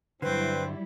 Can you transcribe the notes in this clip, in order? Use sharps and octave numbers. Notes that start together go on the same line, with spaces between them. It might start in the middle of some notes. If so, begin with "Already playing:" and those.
G2 D3 F#3 G3 C4 E4 B4